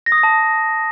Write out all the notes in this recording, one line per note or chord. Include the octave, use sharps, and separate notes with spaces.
A#6
D#6
A#6
A5